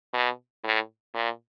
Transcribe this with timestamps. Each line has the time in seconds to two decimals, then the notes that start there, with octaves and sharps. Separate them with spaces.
0.13 B2
0.64 A2
1.14 A#2